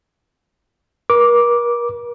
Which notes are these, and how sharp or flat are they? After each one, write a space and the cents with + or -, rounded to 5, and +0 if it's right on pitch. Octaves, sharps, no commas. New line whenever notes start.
A#4 +40 D6 -5